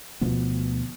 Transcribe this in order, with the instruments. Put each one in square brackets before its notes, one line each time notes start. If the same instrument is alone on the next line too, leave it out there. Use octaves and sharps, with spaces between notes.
[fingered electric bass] D2 B2 F3 B3